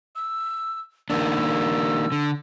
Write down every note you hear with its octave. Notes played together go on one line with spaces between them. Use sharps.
E6
D#3 A#3 D4 E6
D3